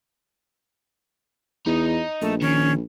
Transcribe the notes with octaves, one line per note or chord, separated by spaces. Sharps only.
E2 D#4 D#5
A#1 A3
D#3 C#4